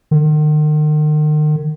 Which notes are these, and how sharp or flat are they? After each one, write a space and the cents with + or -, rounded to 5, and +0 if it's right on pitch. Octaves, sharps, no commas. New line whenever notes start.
D#3 -40